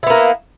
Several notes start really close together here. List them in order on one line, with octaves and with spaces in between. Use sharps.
E4 B3 A#3